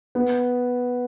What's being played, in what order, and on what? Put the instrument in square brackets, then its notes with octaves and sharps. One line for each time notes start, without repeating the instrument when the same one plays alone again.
[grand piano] B3